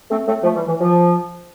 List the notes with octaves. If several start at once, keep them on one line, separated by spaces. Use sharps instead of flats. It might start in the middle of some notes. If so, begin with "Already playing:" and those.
A3 C4
A3 C4
F3 A3
E3 G3
E3
F3